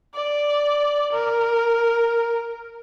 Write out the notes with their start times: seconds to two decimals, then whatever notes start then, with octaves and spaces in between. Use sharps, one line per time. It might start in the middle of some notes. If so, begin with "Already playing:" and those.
0.14 D5
1.12 A#4